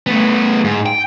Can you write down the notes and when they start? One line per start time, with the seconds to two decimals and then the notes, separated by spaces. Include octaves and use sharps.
0.07 A3 B3
0.64 G#2
0.86 G5